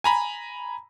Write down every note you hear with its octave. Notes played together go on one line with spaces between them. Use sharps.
G#5 A#5 B5